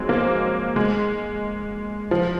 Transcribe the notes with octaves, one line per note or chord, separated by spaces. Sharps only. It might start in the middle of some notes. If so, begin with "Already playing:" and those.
Already playing: F3 F#3 G#3 C4
A#3
G#3
F3